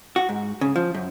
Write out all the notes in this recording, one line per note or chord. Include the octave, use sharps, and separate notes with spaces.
F#4
G#2
C#3
F3
F#2